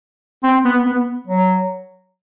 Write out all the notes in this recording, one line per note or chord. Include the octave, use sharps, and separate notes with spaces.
C4
B3
B3
F#3